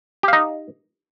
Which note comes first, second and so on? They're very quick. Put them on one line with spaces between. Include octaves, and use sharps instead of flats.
G4 F5 D#4